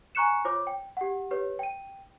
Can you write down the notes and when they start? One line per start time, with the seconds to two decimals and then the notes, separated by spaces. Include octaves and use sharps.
0.15 G#5 A#5 C#6 F#6 C#7 E7
0.45 F4 C5 C#5 D6
0.67 G5
0.97 G4 F#5
1.31 G4 B4 C#5
1.59 G5 D#7